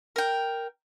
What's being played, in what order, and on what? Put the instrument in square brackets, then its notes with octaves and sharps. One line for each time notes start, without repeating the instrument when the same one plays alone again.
[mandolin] A#4 G5